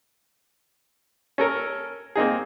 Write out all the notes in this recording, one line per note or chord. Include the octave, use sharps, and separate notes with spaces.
C#4 A4 A#4
A#3 C4 D#4 G#4